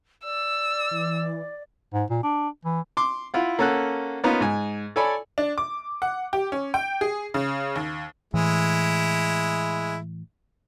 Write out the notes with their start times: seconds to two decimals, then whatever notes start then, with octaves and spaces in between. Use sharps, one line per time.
0.24 D5 E6
0.91 E3
1.94 G#2
2.10 A#2
2.23 D4
2.65 E3
2.97 C6 D6
3.34 E4 F4 F#5
3.59 A#3 C#4 A4 F#5 F#6
4.24 A#3 B3 C#4 D#4 F4
4.41 G#2 G#5
4.96 A4 C#5 D5 G#5 B5
5.38 D4
5.58 D6
6.02 F#5
6.33 G4
6.52 C#4
6.74 G5
7.01 G#4
7.34 C#3
7.76 D#2
8.34 A2 E3 G#3 E4